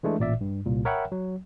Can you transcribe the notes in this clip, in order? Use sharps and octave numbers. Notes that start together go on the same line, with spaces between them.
E3 G#3 A3 D4
A1 A#2 D5 E5
G2
C2 A#2
A#4 C#5 E5 F#5 G5 B5
F#3